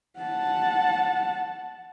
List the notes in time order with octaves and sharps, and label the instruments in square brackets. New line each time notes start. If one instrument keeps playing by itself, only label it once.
[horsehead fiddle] F#5 A5